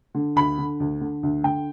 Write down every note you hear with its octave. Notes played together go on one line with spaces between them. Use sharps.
D3
D2 B5
D3
D2
D3
D2
D3 G5